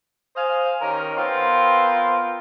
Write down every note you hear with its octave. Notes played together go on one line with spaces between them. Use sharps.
C5 D#5 F5 G#5
D#3 C#4 G4 A#4
B3 C4 F4 A#4 C5